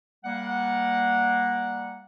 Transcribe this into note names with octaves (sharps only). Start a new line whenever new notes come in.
G3 A#3 F#5